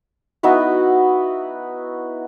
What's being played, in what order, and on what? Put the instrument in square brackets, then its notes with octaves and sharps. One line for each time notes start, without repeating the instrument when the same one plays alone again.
[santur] B3 D#4 E4 F#4